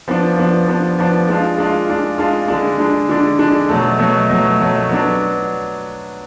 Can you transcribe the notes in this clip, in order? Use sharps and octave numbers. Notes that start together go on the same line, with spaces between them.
F3 B3 D4
F3 B3 D4
F3 B3 D4
F3 B3 D4
G#3 D4 F4
G#3 D4 F4
G#3 D4 F4
G#3 D4 F4
D3 G#3 D4
D3 G#3 D4
D3 G#3 D4
D3 G#3 D4
B2 F#3 A3
B2 F#3 A3
B2 F#3 A3
B2 F#3 A3
F#3 B3 D4